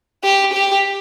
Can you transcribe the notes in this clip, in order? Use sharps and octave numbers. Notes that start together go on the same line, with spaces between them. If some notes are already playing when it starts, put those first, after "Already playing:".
G4
G4